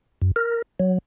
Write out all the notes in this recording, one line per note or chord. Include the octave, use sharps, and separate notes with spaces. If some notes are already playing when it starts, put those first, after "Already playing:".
F#2
A#4
F#3